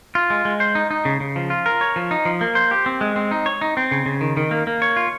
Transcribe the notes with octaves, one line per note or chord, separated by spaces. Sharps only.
F4
G#3
G#3
C5
D#4
D#4
C#3
C#3
F3
F4
A#4
C#5
F3
D#4
F3
A#3
C5
G4
C4
G#3
C4
D#4
C#5
D#4
C4
C#3
C#3
D#3
D#3
A#3
A#3
C#5
F4